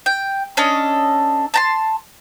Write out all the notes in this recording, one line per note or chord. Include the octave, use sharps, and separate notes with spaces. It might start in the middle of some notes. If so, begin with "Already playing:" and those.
G5
C#4 D4 A4 D#5
A5 A#5 C6